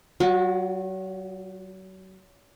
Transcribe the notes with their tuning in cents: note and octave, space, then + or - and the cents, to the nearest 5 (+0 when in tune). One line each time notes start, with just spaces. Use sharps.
F#3 +35 F#4 -30